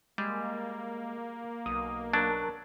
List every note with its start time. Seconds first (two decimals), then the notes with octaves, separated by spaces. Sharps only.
0.18 G3 G#3 A#3
1.66 B1 D#6
2.13 F#3 D4 A#4 A5